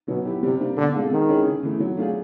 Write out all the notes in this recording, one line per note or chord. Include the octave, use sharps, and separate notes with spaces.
B2 F#3
B3 E4 G4
C3 G3
A#3 D4
B2 D3
G#3 C4 F4
D#3 G#3
C#4 E4 G#4
C#3
E3 A3
F#3
A3 D4 F4 G#4